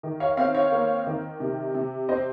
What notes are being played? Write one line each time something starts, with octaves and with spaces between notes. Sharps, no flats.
D#3
C#5 F5
C4 C#5 F5
C#5 F5
A#3
D#3
C3
C3
C4 C5 D#5